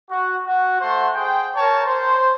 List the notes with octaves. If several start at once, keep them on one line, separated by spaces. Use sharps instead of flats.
F#4
F#4
A3 C5 F#5 C6
G#4 C5 G5
A#4 C#5 A5
C5